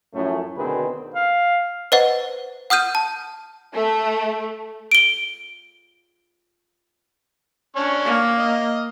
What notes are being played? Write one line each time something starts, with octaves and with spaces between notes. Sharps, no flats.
F#2 A2 F3 A3 C#4
D2 B2 D#3 C4 G#4 B4
F5
B4 C5 D#5 F#5
F#5 D#6 F6 G6 D#7
A5
A3
D7 G7
C#4 D4 C#6
A#3
D#5